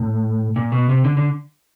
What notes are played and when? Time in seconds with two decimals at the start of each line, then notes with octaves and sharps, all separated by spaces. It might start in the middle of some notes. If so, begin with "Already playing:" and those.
Already playing: A2
0.56 A#2
0.72 B2
0.89 C3
1.04 D3
1.17 D3